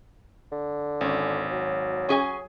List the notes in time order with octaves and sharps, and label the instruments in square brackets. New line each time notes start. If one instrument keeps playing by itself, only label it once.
[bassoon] D3
[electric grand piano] G#1 [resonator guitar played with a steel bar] C#4
[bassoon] F#3
[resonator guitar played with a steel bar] C#4 G#4 G#5